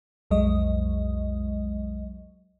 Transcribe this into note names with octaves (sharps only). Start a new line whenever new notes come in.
B1 F2 F#3 G#3 D#5